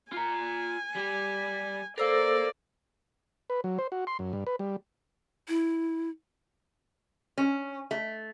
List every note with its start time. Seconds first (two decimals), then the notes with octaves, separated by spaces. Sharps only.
0.12 F4 G#5 A#5
0.95 G3 G4
1.98 A4 A#4 C5 D5 F5 E6
3.50 B4
3.64 F#3
3.79 C5
3.92 F#4
4.07 C6
4.19 F#2
4.33 G2
4.47 B4
4.59 G3
5.48 E4
7.38 C#4
7.91 A3